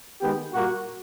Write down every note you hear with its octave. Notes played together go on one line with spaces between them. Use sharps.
D#3 G#3 B3 G4
A#2 G3 A#3 F#4